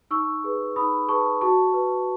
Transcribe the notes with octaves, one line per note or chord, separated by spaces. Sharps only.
D#4 C#6 E6
G#4 B4
D#4 B5 D#6
G#4 B4 A5 C#6
F#4 A5 C#6
B4